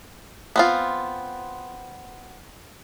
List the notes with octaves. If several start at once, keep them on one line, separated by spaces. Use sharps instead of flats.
B3 C4 F4